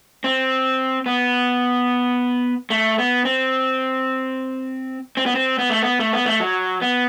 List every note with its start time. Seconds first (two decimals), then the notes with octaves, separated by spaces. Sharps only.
0.24 C4
1.06 B3
2.70 A3
2.98 B3
3.25 C4
5.17 C4
5.26 B3
5.35 C4
5.59 B3
5.70 A3
5.82 B3
6.00 A3
6.13 B3
6.26 A3
6.40 F#3
6.82 B3